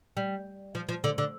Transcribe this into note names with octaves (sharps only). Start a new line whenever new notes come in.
G3
F3
F3
D3
D3